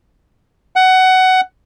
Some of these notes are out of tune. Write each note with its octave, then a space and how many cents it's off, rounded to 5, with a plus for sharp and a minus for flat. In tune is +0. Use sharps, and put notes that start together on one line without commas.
F#5 +15